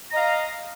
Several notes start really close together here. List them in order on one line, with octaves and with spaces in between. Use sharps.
A#5 D#5 F5